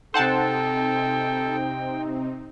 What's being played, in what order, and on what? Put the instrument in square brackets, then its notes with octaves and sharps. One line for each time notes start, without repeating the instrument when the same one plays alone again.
[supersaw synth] C3 C4 D#4 [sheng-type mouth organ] A4 [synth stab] C5 F#5 A5 [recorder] G5